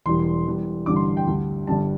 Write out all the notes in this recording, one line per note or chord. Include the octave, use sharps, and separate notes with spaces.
E1 E2 E3 G3 C6
E2 E3 G3
A1 G2 D3 G3 D6
C6
G5
D2 D3 G3
G1 G2 D3 G3 A5